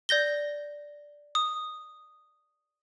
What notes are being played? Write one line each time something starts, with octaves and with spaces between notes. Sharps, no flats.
D5 G6 A#6 G7
D#6